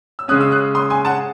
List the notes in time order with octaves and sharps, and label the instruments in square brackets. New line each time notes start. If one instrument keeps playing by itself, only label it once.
[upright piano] E6
[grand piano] C#3 G#3 C#4 [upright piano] D#6 F#6
[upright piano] E6
D#6 F#6
C6 D#6
G#5 C6
F#5 A5